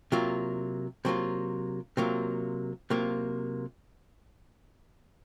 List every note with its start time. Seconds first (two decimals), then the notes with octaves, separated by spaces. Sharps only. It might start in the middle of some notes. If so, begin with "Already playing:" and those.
0.12 C3 F#3 A#3 F4
1.05 C3 F#3 A#3 F4
1.97 C3 F#3 A#3 F4
2.90 C3 F#3 A#3 F4